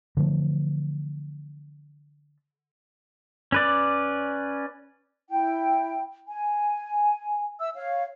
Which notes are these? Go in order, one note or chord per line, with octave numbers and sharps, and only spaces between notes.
D3 E3 F3 A3
C#4 B4 D5
E4 G5
G#5
E5 E6
C#5 F5